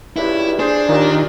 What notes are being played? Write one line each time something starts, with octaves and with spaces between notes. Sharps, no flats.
C#2 G2 E4
D4 G#4 C5
D#2 A#2 D#3